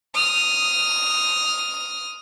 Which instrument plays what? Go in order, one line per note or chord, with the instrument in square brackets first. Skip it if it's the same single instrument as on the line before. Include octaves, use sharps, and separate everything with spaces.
[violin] D#6 F6